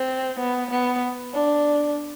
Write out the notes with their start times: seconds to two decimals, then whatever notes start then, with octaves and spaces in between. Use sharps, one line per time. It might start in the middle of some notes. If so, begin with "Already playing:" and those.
Already playing: C4
0.40 B3
0.71 B3
1.35 D4